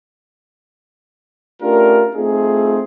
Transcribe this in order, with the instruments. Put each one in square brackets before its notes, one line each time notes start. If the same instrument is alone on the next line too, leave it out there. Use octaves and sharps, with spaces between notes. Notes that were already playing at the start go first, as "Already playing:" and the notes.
[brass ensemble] A3 C#4 D4 F4 G4 A#4
A3 C4 D#4 F4 G#4